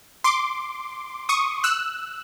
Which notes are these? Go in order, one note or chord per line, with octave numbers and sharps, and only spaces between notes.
C6 D6
C#6 D#6
E6 F#6